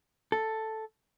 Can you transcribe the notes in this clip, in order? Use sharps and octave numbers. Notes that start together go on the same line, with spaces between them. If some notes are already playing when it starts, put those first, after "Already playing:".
A4